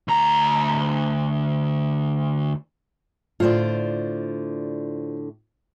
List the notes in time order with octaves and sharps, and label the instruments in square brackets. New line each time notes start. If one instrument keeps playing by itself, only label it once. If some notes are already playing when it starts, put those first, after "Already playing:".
[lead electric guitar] D2 A#5
[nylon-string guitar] A2 D3 [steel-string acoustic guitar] F4 C5 D5